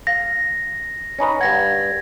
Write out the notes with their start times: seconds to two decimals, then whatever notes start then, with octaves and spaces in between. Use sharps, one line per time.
0.07 F5 A#6
1.18 C#4 D#4 B4
1.41 G2 F#5 G#6 A#6